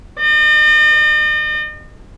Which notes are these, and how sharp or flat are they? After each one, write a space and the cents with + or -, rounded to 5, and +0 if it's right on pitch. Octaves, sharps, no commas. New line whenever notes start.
D#5 -45